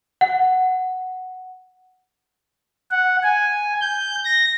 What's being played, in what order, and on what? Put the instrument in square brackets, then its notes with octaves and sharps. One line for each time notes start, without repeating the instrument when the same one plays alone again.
[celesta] F#5
[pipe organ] F#5
G#5
G6
A#6